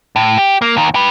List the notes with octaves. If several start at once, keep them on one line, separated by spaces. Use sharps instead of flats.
A2
G4
A#3
D#2 D#3
G4 B4